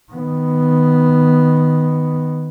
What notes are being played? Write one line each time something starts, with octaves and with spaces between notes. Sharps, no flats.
D#3 B3